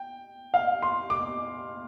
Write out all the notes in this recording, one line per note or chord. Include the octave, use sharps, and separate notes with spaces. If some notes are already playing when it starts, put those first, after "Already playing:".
Already playing: G5
F5
C6
D6